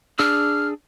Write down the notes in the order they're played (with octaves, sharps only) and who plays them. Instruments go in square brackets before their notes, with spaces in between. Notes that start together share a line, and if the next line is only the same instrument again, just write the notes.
[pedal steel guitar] D4 G#4 E6 [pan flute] F6